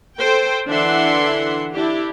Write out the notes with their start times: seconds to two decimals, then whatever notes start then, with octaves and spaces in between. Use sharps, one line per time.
0.17 A4 C5 G5
0.68 D3 E3 D4 E5 F#5 C6
1.73 D4 E4 G4